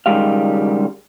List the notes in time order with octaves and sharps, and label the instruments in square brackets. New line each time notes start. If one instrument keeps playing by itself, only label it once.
[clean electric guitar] C#2 D#3 G3 G#3 G4 F5